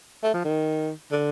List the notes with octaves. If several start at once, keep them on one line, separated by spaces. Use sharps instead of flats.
A3
F3
D#3
D3